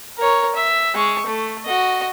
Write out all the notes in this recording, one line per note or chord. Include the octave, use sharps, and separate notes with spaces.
A#4 C#5
E5
G#3 C#6
A3
F#4 D#5